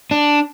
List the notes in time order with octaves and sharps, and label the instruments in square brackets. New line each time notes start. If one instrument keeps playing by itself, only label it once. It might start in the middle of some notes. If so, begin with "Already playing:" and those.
[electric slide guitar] D4